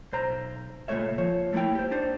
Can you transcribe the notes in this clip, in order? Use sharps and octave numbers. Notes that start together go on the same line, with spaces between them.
B1 C5 A#5
C#2 A#2 F#3 A3 C#5 E5
F3 C#5
A3 A#3 C4 E4 G5
G4 C5
D4 D#4 C5